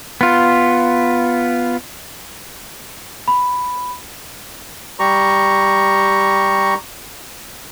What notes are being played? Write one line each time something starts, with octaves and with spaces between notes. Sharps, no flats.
B3 F4
B5
G3 G4 A#5 C#6